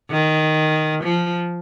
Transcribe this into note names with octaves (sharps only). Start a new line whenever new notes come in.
D#3
F3